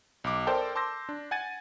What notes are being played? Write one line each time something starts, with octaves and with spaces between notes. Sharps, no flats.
B1 D6
A4 A#4 C5 D5 G5 A5
A5 C6 D6 E6 G6 A#6
D4
F#5 G#5 G#6 A6 D#7